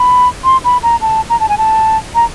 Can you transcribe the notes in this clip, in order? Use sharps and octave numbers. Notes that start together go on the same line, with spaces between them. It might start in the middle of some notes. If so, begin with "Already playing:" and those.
Already playing: B5
C6
B5
A#5
A5
A#5
A5
G#5
A5
A#5